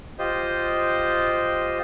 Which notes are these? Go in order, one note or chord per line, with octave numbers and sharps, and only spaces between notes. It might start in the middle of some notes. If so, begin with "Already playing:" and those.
F4 G4 C5 D#5